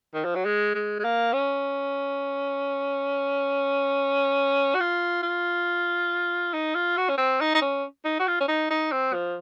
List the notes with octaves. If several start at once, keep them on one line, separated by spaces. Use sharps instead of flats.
D#3
F3
F#3
G#3
G#3
G#3
A#3
C#4
F#4
F4
F4
D#4
F4
F#4
C#4
C4
D#4
D#4
C#4
D#4
F#4
F4
C#4
D#4
D#4
C4
F3